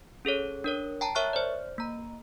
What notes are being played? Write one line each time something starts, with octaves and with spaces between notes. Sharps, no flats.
C#4 G#4 A4 C#5
D4 A#4 C#5
G5 A5 A#5
A#4 C#5 E5 C#6 F6 F#6
C5 D5
A#3 A#5